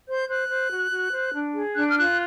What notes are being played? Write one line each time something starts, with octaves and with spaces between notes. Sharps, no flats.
C5 G6
C5 F#6
C5
F#4
F#4
C5
D4
G#4
D4 F#6
F6
F4 F#6